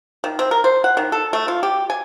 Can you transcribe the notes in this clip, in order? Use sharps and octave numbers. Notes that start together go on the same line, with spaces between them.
D#3
C4
A#4
C5
F#5
D#3
A4
A3
F4
G4
G#5